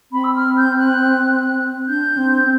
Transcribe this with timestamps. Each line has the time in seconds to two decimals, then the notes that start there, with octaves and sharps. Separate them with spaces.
0.12 C4 B5
0.23 E6
0.35 F6
0.56 G6
0.78 F#6
1.88 D4 G6
2.17 C4